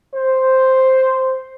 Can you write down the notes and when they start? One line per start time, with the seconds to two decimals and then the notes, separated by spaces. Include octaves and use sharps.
0.14 C5